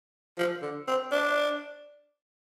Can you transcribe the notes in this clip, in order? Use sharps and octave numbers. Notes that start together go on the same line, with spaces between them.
F3
D3
C4
D4